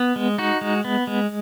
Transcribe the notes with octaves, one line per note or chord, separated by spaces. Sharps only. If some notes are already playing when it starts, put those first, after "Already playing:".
Already playing: B3
G#3
D#4 F#4
G#3
B3
G#3